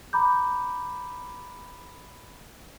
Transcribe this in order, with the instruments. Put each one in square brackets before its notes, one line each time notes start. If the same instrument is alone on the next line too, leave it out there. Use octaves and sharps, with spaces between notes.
[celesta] A#5 B5 D6 G6